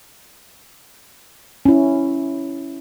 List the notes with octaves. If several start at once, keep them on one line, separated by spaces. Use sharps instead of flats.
C#4 E4